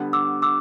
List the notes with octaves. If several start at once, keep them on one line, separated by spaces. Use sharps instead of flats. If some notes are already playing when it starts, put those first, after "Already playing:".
Already playing: D3 G3 B3
D6 E6
D6 E6